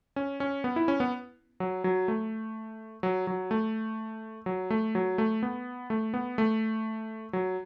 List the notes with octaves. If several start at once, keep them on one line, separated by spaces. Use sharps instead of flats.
C#4
C#4
B3
E4
C#4
B3
F#3
F#3
A3
F#3
F#3
A3
F#3
A3
F#3
A3
B3
A3
B3
A3
F#3